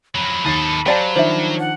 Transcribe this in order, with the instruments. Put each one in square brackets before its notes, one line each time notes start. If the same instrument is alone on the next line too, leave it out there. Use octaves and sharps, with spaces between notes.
[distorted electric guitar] F2 F#3 [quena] B5
[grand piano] D#2 A6 C7 [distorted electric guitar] A4 D#5
[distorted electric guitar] F#3 [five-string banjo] G4 D5 A5 [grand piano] C5 F5
[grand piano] D#3 F3 D4 [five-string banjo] C5 E5
[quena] F#5